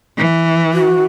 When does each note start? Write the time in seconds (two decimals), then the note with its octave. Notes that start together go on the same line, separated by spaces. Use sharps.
0.18 E3
0.73 F#4